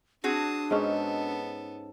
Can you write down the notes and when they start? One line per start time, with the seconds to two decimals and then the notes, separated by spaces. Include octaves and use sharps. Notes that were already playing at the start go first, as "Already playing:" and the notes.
0.24 C4 D4 F#4 G#4 A5 D#6
0.71 G#2 B3 C#4 D#4 A4